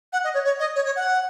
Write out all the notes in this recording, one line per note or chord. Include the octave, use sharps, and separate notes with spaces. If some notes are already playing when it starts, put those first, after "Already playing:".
F#5
D#5
C#5
C#5
D#5
C#5
C#5
F#5